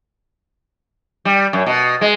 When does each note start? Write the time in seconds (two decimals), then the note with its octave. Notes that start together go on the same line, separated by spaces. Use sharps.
1.25 G3
1.53 F#2
1.66 B2
2.01 G#3